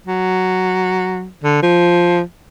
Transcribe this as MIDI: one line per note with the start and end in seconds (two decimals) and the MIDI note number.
0.07 1.28 54
1.44 1.60 50
1.63 2.22 53